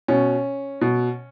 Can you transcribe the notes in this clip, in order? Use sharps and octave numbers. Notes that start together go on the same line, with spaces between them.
B2 C#4
B2